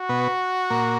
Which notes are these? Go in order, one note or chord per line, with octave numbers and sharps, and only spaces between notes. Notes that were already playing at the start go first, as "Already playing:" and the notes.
Already playing: F#4
B2 B3
A#2 A#3